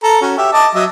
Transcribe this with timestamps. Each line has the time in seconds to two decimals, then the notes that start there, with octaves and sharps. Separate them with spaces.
0.03 A4 A#5
0.22 C#4 F#4
0.38 G4 E5
0.53 D#5 A5 D6
0.75 F#3 D#5 E5